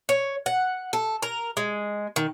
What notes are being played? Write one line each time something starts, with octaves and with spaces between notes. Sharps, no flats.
C#5
F#5
A4
A#4
G#3
D#3